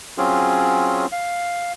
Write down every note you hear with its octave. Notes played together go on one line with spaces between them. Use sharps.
F#3 C4 C#4 F4 G#4
F5